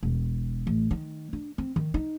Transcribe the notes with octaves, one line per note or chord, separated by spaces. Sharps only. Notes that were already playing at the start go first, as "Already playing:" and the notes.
E1
A1
D#3
D4
C4
D#3
D#4